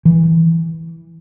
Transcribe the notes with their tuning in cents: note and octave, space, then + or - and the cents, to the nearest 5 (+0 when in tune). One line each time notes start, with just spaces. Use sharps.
E3 -5